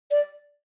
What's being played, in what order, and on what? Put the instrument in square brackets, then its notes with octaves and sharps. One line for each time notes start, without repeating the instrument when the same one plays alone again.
[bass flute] D5